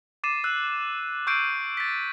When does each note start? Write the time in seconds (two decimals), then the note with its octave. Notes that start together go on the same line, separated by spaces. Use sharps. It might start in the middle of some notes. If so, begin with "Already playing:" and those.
0.24 D6 A6 C7 D#7 E7
0.44 E6 F#6
1.27 C#6 E6 G6 C7 D7 D#7
1.77 A6 B6